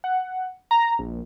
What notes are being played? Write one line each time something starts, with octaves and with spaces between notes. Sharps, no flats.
F#5
A#5
A#1